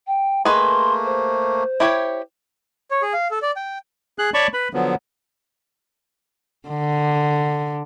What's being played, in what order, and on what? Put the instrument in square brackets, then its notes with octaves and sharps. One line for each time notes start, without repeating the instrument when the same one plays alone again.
[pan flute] G5
[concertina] A3 A#3 [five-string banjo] G#4 B4 D#5 [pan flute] C6
[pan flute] C5
[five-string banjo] E4 G4 C#5
[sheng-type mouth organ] C#5
G#4
F5
A4
D5
G5
[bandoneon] G#4 F#6
C#5 D5 A5 B5 C#6
B4 B5
D3 F3 F#3 B3
[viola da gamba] D3